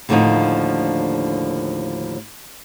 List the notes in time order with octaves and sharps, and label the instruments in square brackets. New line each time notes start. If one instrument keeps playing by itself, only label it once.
[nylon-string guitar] D#2 A2 D3 D#3 F3 D#4